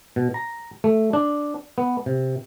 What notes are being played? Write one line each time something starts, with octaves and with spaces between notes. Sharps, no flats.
B2
A#5
A3
D4
B3
C3